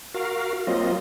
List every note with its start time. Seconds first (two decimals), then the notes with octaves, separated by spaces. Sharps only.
0.14 F#4 A#4 F5
0.67 F#3 A#3 C4 F4 D#5